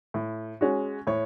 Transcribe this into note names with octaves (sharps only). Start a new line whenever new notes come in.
A2
G#3 C#4 F#4
A2 C#5